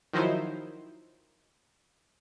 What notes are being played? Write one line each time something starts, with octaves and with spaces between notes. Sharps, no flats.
D#3 F3 F#3 D#4 E4 C5